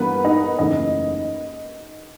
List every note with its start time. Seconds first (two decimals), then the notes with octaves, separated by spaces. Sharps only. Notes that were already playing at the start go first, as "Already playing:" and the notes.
Already playing: G2 E3 G3 A#3 B3 A#4 B4
0.25 D#4 D#5
0.58 F#1 E2 C#3 E3 A3 D#4 D#5